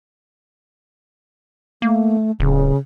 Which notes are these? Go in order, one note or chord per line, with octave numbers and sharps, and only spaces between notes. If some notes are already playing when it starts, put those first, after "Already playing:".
A3 A#3
D1 C#3